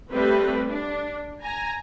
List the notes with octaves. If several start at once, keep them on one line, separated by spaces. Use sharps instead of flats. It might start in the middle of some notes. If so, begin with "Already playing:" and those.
G3 A3 C4 B4
D4
G#5 A#5